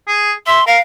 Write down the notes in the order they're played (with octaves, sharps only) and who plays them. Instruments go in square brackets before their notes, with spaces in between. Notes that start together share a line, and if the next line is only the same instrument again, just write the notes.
[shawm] G#4
[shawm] E5 [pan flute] C6
[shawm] A#4 [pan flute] F5